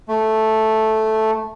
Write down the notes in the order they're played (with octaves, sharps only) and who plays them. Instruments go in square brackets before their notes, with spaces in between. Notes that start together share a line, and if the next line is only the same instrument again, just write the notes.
[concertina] A3